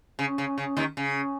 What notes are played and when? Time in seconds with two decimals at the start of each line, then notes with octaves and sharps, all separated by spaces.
0.19 C#3
0.38 C#3
0.58 C#3
0.77 D#2 D#3
0.97 C#3